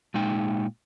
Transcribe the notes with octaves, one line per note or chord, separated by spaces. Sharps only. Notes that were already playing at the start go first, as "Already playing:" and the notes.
A#2 G#3 D#4 G5